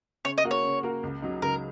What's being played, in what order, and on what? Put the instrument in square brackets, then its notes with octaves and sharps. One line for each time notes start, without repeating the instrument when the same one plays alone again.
[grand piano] C#3 [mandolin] C#5
[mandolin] D#5
[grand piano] A#3 F#4 A#4
[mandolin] C#5
[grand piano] C#3
A#3 F#4 A#4
C#2
C#3 F#3 D#4
[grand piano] C#2 [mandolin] A#4